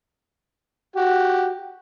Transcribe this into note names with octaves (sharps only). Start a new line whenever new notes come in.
F#4 G4